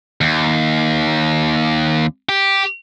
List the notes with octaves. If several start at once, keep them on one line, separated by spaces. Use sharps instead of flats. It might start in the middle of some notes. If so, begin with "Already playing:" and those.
D#2
G4